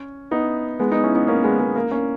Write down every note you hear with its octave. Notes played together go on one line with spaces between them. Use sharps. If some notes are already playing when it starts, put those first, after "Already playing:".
Already playing: C#4
B3 D#4
G#3 B3
B3 D#4
C#4 E4
B3 D#4
A#3 C#4
G#3 B3
G#3 B3
A#3
A#3 C#4